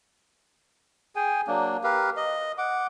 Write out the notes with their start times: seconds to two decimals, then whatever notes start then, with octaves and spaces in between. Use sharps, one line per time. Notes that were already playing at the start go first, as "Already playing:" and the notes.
1.16 G#4 G5 G#5
1.47 F#3 A#3 D4
1.84 G4 A#4 B4 F5
2.17 D#5
2.58 F#5 D6